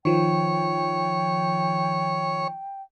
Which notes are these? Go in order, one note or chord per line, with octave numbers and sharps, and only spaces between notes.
D#3 F3 C#5 G5